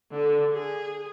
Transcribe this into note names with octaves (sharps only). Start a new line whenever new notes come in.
D3
G#4